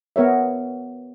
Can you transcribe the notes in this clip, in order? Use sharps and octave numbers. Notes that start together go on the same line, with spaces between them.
B3 A#4 C#5 E5